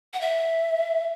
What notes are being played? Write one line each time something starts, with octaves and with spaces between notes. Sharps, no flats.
F#5
E5